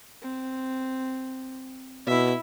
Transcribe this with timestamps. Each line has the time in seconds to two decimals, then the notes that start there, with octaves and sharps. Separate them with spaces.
0.22 C4
2.07 B2 E4 E5